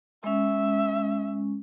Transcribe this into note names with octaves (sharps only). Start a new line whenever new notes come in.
G#3 C#4 E5